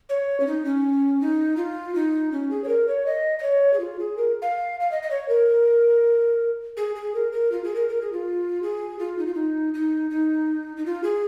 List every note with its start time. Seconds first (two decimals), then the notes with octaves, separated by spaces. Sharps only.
0.09 C#5
0.40 C#4
0.47 D#4
0.65 C#4
1.21 D#4
1.57 F4
1.95 D#4
2.32 C#4
2.51 G#4
2.64 C#5
2.68 A#4
2.88 C#5
3.06 D#5
3.39 D#5
3.43 C#5
3.74 G#4
3.80 F4
3.99 G#4
4.17 A#4
4.42 F5
4.80 F5
4.92 D#5
5.02 D#5
5.11 C#5
5.29 A#4
6.77 G#4
6.95 G#4
7.15 A#4
7.32 A#4
7.52 F4
7.64 G#4
7.75 A#4
7.89 A#4
8.01 G#4
8.12 F4
8.63 G#4
8.99 F4
9.18 D#4
9.27 F4
9.35 D#4
9.74 D#4
10.10 D#4
10.77 D#4
10.86 F4
11.04 G#4